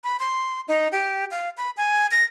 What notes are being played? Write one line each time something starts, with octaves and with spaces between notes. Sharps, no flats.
B5
C6
D#4
G4
F5
B5
G#5
A#6